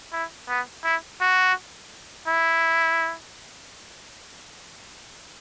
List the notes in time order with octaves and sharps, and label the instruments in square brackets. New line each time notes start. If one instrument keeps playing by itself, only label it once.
[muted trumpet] E4
B3
E4
F#4
E4